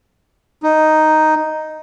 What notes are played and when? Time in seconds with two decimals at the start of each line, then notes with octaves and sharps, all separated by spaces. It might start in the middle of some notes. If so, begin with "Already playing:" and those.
0.63 D#4